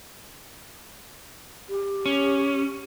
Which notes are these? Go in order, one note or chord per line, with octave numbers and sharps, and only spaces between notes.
G4
C#4